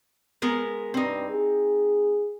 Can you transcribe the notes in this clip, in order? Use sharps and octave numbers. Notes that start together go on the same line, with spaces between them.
G#3 B3 A#4
G2 C4 D#4
G#4